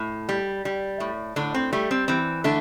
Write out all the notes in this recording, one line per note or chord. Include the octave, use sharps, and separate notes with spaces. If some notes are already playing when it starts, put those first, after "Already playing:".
Already playing: A2
G3
G3
A2
A2 D3 D4
C4
G3 A3
C4
E3 C4
D3 A3 D4